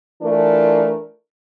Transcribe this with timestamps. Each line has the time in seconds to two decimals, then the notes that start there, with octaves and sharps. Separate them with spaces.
0.22 E3 A3 D4 F4 A#4